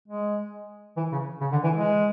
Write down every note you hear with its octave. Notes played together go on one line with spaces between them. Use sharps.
G#3
E3
C#3
C#3
D3
E3
G#3